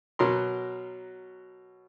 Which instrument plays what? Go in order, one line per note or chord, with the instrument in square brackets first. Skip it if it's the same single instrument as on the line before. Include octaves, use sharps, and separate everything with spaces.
[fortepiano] B2 F#3 A#4 C6